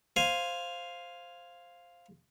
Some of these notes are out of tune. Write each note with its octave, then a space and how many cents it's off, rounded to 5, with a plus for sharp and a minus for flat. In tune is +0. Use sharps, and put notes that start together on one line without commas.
C5 +0 F5 +0 G#5 +0